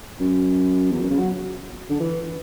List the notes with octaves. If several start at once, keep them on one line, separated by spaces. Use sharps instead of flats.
F#2
E2
F#2
C#3
F#3
D3
E3